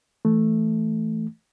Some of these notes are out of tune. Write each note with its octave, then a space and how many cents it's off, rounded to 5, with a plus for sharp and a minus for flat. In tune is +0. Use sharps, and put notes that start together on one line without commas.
E3 +0 A3 +0